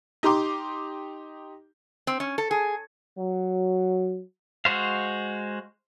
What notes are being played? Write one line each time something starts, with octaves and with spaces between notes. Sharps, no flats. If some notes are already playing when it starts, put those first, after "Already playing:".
D#4 G4 A#5 C6 D6
C4
C#4
A4
G#4
F#3
G#3 F#4 C5 F5